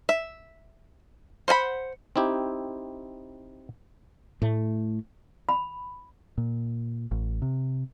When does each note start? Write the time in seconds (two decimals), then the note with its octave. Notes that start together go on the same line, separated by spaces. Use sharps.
0.09 E5
1.48 C5 F#5 G#5 B5
2.16 C4 D#4 E4 G4
4.42 A2 A3
5.49 B5
6.38 A#2
7.11 A1
7.42 C3